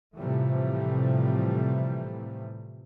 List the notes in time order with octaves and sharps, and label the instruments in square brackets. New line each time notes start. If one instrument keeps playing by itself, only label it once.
[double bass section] A2 C3 E3 F3 G3 A3